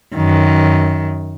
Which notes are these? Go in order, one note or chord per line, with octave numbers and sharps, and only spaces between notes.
F#2 D#3